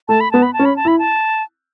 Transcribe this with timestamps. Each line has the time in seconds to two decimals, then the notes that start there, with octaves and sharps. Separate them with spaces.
0.08 A3 A5
0.20 B5
0.32 B3 A5
0.43 B5
0.53 A5
0.59 C#4
0.65 B5
0.76 A5
0.85 E4
0.88 B5
0.99 A5